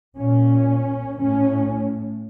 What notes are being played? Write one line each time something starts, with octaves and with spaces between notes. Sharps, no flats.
A#2 C#4
A2 C#4